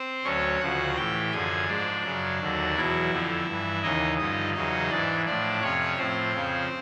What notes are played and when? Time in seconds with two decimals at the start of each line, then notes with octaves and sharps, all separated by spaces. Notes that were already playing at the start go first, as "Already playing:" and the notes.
Already playing: C4 C5
0.24 D2 D3 F#3 C#4 C#5
0.60 D2 C#3 F3 F#4 F#5
0.96 A2 E3 G4 G5
1.32 F#2 D3 F3 G#4 G#5
1.67 G#2 F3 D4 D5
2.03 F#2 C#3 F#3
2.40 D#2 D3 F#3
2.75 E2 B2 F#3 E4 E5
3.11 F2 D3 F3
3.46 G2 E3
3.82 D#2 C#3 E3 D#4 D#5
4.18 G2 D3 F3 D#4 D#5
4.54 E2 C#3 F#3 D#4 D#5
4.90 G#2 E3 D4 D5
5.25 A2 F3 D4 D5
5.61 F2 C3 F3 C#4 C#5
5.97 A2 F3 C4 C5
6.33 F2 C#3 F3